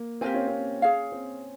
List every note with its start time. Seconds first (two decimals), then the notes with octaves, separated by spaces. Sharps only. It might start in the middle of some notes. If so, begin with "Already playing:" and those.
Already playing: A#3
0.21 C4 G4 A#4 F5 G#5
0.34 C#4
0.47 C4
0.82 C#4 G#4 C#5 F5
1.12 C4